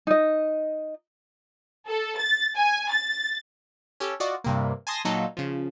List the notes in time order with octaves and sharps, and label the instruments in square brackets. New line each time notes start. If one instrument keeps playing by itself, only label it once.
[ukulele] D#4 D#5
[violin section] A4
A6
G#5
A6
[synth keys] C#4 G4 A4
F4 F#4 D5 D#5
G2 C3 A#3
G#5 A5 C6 D#6 A#6
A#2 F#3 D#4 F4 A4
C#3 F3